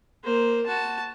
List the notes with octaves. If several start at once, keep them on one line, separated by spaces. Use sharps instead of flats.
A#3 C5
F#4 A5